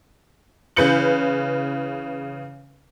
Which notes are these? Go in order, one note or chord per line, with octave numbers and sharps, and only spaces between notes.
C#3 E3 B4 G6 C#7 F#7